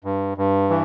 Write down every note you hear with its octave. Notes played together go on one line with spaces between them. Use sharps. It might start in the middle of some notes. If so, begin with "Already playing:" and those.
G2
G2
E3